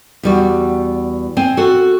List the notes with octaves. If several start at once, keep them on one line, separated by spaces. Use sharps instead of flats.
E2 G3 F#4
C4 G#5
F#4 A4